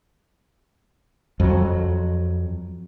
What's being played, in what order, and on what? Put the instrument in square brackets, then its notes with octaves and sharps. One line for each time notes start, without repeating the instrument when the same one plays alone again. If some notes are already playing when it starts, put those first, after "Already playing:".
[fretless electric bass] F2 F#3